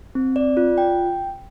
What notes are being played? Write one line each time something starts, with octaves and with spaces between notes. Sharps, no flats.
C4
D5
F4
G5